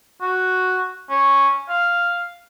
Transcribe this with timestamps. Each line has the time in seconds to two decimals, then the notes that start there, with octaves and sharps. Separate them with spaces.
0.21 F#4
1.10 C#4
1.69 F5